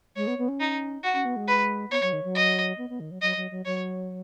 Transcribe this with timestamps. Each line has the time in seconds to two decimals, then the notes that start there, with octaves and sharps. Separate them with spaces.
0.16 G#3 C#5
0.27 B3
0.38 B3
0.48 C#4
0.60 D#4
1.04 F#4
1.14 C#4
1.25 B3
1.36 G#3
1.47 B4
1.91 B3 C#5
2.02 F#3
2.13 D#3
2.24 F#3
2.35 D#5
2.78 B3
2.89 B3
3.00 D#3
3.11 F#3
3.22 F#3 D#5
3.36 F#3
3.51 F#3
3.65 F#3 C#5